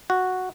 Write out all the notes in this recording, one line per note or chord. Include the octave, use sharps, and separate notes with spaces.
F#4